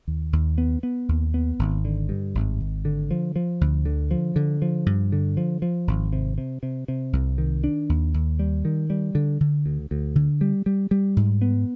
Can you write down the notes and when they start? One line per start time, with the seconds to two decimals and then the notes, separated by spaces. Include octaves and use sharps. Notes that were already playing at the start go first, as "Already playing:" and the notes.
0.08 D#2
0.33 D#2
0.58 B3
0.83 B3
1.09 D#2
1.34 B3
1.59 G#1
1.85 D3
2.09 G2
2.35 G#1
2.60 G#1
2.85 D3
3.11 F3
3.36 F3
3.61 D2
3.85 D3
4.11 F3
4.36 D3
4.62 F3
4.86 G2
5.12 D3
5.37 F3
5.62 F3
5.87 G#1
6.13 C3
6.38 C3
6.63 C3
6.88 C3
7.13 C2
7.38 D#3
7.64 D4
7.89 D#2
8.14 D#2
8.39 G3
8.65 D#3
8.90 G3
9.15 D3
9.41 D3
9.66 D2
9.91 D2
10.16 D3
10.41 G3
10.66 G3
10.91 G3
11.17 G#2
11.42 B3